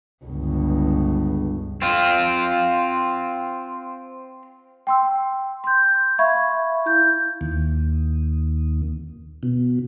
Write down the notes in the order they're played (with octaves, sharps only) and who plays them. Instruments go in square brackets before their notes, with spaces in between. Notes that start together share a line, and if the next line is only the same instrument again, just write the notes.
[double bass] G1 C#2
[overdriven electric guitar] C4 F4
[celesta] G5 C6 E6
C6 G6
E5 F5 B5 C#6 G#6
E4 G6
[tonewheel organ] D#2
B2